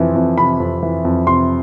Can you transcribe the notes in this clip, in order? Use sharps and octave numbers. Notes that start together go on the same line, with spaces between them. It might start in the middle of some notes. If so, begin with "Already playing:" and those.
Already playing: F2 C3 E3
F2
C3 B5
F2
E3
F2
C3 C6